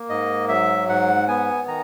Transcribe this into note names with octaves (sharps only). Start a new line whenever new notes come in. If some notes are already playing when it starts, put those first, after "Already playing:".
Already playing: A#3
G#2 D#5
F#3 E5
G#2 F#5
B3 G#5
D#3 A#5